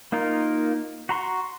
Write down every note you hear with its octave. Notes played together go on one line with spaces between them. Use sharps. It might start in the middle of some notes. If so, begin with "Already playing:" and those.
A#3 D#4 F4 A#4
F#4 A#5 C6 C#6